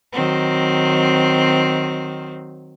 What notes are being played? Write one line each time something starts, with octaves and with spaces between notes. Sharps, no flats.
D#3 F#3 C4